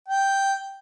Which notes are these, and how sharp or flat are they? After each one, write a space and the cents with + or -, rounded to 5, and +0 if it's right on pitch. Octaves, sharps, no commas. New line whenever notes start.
G5 +0